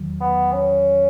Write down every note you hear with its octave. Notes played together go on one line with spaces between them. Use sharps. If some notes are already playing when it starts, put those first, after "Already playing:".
Already playing: E2 D#3 F#3
B3
C#4